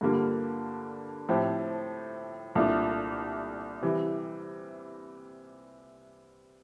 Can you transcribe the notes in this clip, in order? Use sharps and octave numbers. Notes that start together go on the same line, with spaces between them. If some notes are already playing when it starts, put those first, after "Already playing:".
G2 D3 G3 A#3 F4
A2 F3 A3 C4 G4
C2 A#2 A3 D4 F4
C3 E3 G3